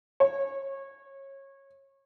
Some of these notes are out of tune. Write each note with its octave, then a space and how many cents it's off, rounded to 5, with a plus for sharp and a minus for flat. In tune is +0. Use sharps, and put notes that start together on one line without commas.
C#5 -25